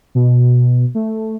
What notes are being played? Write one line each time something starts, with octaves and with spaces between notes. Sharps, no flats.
B2
A3